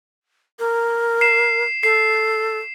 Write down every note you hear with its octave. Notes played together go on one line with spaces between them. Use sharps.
A#4
C7 E7
A4 C7